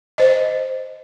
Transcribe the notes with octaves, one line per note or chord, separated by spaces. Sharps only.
C5 D#5